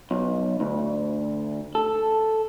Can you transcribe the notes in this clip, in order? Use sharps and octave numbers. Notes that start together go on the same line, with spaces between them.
B1
D2
A4